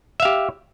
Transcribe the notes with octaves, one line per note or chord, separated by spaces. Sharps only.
G4 E5 F5